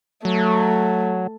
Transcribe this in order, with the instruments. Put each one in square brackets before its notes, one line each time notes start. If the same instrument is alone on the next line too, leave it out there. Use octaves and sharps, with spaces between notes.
[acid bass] F#3 [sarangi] A3